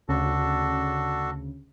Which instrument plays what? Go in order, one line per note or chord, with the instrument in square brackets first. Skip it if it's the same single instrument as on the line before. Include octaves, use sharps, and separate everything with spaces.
[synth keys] D2 C#3 [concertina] D4 F#4 A4